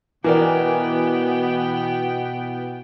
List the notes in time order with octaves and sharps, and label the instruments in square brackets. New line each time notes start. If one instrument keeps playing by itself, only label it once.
[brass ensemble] B2 [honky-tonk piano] E3 [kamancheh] B3 G5 [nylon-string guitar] F#4 A#4 D5